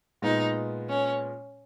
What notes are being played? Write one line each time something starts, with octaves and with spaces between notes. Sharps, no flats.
A#2 G#3 B3 D#4
C#4